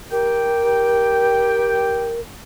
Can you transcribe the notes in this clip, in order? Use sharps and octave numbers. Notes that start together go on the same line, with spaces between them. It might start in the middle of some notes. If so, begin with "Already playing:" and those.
G4 A#4 G5